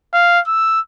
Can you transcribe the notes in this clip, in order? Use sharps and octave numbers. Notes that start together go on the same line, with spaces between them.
F5
E6